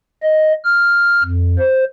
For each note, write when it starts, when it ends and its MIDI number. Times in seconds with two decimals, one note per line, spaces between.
0.23 0.53 75
0.64 1.23 89
1.23 1.56 41
1.59 1.85 72